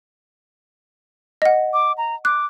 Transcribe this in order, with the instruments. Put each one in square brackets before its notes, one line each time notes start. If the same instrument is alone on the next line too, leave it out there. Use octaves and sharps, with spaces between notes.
[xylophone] D#5 F#5
[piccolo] D6
A#5
[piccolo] D6 [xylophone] F#6